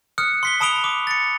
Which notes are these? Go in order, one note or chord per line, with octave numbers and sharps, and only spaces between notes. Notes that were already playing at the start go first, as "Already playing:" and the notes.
D#6 F6 F#6 C#7
C6 B6 G7
A5 B5 D#6 D7 F7 G7
D6
A6 C#7